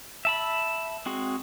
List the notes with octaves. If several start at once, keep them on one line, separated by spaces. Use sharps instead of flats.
E5 A5 B5
G#3 C4 F#4 G#4